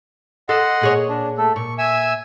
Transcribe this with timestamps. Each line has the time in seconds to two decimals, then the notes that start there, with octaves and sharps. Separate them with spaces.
0.49 A4 D#5 F#5 C6
0.81 A#2 G#4 C#5
1.09 D4
1.38 A3 A4
1.56 A#2 C#6
1.78 E5 G#5 E6